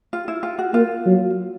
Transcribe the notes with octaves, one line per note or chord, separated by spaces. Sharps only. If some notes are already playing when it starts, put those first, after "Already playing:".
F4
E4
F4
F#4
A#3 F4
F#3